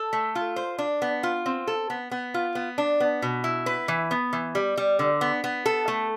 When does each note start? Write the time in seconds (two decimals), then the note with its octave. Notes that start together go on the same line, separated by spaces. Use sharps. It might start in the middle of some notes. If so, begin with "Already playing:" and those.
Already playing: A4
0.13 A3
0.35 F4
0.56 C5
0.78 D4
1.02 B3
1.23 F4
1.46 C4
1.67 A4
1.90 B3
2.11 B3
2.34 F4
2.55 B3
2.78 D4
3.00 B3
3.22 B2
3.44 E4
3.66 B4
3.88 E3
4.11 B3
4.33 E3
4.55 G3
4.77 G3
4.99 D3
5.21 B3
5.44 B3
5.66 A4
5.88 A3